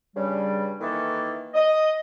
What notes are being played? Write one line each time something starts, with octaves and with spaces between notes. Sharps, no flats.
G2 C#3 G3
D#3 E3 A#3 A4
D#5